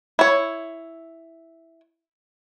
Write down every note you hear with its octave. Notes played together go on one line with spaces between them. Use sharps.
E4 C#5